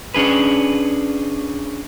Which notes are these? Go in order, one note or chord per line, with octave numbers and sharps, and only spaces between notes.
C#4 D4 G#4 B4